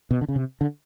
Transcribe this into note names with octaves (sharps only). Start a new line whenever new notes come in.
B2
D3
C#3
C3
D3